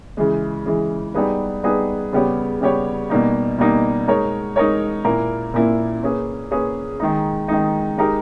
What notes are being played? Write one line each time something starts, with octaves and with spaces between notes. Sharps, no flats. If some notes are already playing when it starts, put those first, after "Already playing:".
C#3 E3 G#3
C#3 E3 G#3
G3 B3 D#4 G#4 B4
G3 B3 D#4 G#4 B4
C#3 G3 B3 G4 C#5
C#3 G3 B3 G4 C#5
B2 G3 A#3 D#4
B2 G3 A#3 D#4
G#3 D#4 A#4 C#5
G#3 D#4 A#4 C#5
A#2 A#3 E4 A#4
A#2 A#3 E4 A#4
A#3 C#4 G#4 B4
A#3 C#4 G#4 B4
D#3 G#3 D#4
D#3 G#3 D#4
G#3 D#4 G4 A#4